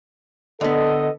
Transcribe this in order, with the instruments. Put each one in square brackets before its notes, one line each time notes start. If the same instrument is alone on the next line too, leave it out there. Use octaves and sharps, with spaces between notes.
[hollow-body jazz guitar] D3 B3 [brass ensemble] A4 D#5